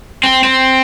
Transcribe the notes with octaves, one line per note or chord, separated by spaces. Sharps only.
C4
C4